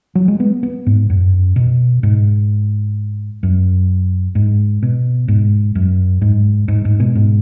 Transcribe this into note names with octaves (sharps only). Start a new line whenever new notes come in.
F#3
G#3
B3
B3
G#2
F#2
B2
G#2
F#2
G#2
B2
G#2
F#2
G#2
G#2
G#2
B2
G#2